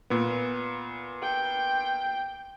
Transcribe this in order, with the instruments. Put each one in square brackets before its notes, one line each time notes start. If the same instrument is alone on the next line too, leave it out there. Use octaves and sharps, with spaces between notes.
[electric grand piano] A#2 B3
[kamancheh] G5